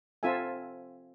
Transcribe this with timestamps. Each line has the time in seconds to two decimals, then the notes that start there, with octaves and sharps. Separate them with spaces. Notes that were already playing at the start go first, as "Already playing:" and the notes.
0.23 C4 F4 A4 E5 G#5